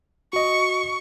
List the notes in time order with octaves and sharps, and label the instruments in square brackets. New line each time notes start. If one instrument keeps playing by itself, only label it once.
[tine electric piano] F#4 D#5 [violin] C#6